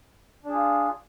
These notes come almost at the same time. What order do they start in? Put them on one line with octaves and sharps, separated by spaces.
D4 G#4 F4